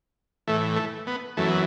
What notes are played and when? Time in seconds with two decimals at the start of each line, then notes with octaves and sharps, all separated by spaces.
0.47 A2 E3 A3
0.76 A3
1.07 B3
1.37 F#2 E3 A3
1.48 B3